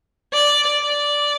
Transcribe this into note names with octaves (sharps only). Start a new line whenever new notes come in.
D5
D5